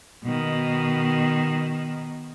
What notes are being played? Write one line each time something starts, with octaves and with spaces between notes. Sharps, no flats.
B2 D#3